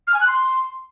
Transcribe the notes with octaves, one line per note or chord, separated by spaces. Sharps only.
F6
G#5
F#6
C6